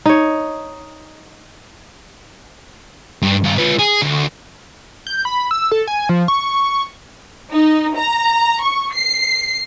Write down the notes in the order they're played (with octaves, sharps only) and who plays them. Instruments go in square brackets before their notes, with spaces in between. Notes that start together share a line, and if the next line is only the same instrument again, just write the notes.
[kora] D#4 C#5
[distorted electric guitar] G2
G2 F4
F4 B4
G#4
D2
[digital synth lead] G6
B5
E6
A4
G#5
F3
C#6
[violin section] D#4
A#5
C#6
C7